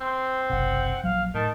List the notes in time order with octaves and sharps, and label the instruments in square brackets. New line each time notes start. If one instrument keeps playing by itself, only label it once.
[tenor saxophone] C4 [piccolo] C6
[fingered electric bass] F#1 B1 C3 [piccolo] F#5
[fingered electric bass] A#1 F3 F#3 [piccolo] F5
[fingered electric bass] A2 [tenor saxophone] D#3 [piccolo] A5